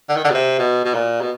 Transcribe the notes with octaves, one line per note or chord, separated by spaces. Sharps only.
D3
D#3
D3
B2
C3
B2
B2
A#2
B2